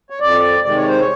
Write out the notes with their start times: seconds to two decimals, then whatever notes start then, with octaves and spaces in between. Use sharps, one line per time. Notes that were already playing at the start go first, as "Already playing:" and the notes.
0.10 C#5
0.20 F2 D5
0.64 C3 D#3 G#3 D5
0.77 C#5
0.88 C5
1.00 C#5